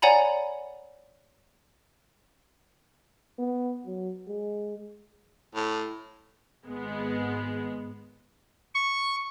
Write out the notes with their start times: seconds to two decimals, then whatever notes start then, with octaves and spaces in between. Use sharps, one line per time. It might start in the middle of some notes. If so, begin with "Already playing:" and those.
0.02 C#5 D5 F#5 G#5 A#5 B5
3.39 B3
3.87 F#3
4.29 G#3
5.55 A2
6.65 G#1 G#3 B3
8.75 C#6